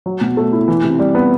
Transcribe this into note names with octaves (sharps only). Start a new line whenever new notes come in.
F#3
B2
A3
E4
E3
C3
G3
B3